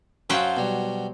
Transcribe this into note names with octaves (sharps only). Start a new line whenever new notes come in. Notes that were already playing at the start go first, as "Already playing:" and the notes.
F#2 F3 F#3 F4 C5 G5
B2 G3